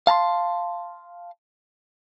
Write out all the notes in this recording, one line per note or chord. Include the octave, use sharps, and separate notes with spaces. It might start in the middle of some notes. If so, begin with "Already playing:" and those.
F5 A5 A#5 C6